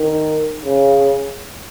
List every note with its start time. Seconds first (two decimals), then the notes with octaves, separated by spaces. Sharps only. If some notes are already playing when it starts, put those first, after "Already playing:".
Already playing: D#3
0.65 C#3